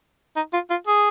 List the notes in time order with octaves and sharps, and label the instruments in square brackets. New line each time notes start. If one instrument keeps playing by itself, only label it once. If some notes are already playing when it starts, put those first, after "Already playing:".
[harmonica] D#4
F4
F4
G#4